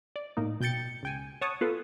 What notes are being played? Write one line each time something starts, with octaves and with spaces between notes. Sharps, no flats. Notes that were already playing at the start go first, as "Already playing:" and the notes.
D5
A2 A#3 D#4
B2 G5 G6 A6 C#7
C#2 G5 G#5
C#5 F#5 A5 C#6 D#6
B3 F4 A4 B4